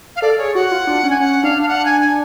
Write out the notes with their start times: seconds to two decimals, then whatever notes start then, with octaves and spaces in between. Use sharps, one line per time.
0.16 F5
0.22 A4 D5
0.38 G#4 C#5
0.55 F#4 F#5
0.71 F4
0.87 D4
1.04 C#4
1.10 G#5
1.20 C#4 F#5
1.44 D4 F5
1.62 F5
1.69 F#5
1.85 G#5
2.01 G#5